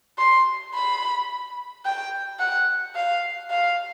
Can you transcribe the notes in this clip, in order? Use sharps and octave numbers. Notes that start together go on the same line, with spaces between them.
C6
B5
G5
F#5
F5
F5